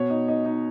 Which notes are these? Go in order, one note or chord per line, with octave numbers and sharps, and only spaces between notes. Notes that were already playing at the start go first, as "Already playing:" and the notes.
Already playing: B2 C#5
D#4
D#4
D#4